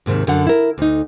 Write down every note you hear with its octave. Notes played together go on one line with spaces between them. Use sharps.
D#2 G#2 C3 D#3
F#2 D3 F#5
E4 A#4
D2 D#4